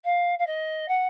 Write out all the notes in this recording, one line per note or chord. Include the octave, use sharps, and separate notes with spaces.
F5
F5
D#5
F#5